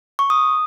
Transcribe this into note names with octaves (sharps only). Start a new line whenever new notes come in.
C#6
D#6